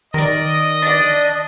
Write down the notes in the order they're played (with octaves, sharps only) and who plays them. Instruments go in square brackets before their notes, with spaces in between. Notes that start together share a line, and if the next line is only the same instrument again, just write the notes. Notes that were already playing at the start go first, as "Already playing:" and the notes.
[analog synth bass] D#3 [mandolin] A#4 D5 [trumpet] D#5
[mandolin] D4 D5